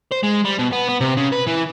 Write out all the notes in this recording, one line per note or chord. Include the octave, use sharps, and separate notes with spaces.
C5
G#3
G3
B2
B3
B3
C3
C#3
B4
E3